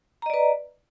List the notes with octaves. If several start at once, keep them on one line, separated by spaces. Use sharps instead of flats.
B4 D5 D#5 A#5